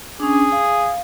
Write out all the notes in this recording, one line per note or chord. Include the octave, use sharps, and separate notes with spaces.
C#4 D4 G#4
F5